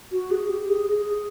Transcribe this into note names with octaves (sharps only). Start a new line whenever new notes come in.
F#4
G#4
G4
G#4
G#4